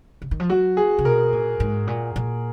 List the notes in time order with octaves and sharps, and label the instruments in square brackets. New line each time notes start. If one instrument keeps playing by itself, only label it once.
[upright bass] C#3
D#3
F3
[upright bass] F#3 [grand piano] F#4
[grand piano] G#4
[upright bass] C#3
[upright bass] B2 [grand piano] A#4
[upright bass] A#2
G#2
A#2
A#2